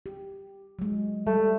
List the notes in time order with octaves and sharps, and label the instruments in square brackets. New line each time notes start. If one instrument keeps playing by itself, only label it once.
[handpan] G4
F#3 G#3
[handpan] G3 [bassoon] A3